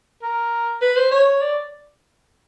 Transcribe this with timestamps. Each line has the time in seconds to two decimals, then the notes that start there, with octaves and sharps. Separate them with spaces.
0.22 A#4
0.81 B4
0.97 C5
1.11 C#5
1.41 D5